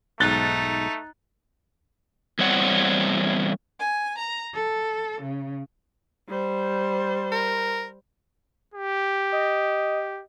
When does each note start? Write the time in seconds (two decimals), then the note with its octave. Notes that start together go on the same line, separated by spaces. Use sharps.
0.20 B1 G#2 A3 D#4 F#6 A6 G7
2.39 E2 G3 C4 C#5 F#5
3.80 G#5
4.18 A#5
4.54 A4
5.22 C#3
6.29 G3 C5
7.32 A#4
8.74 G4
9.32 D#5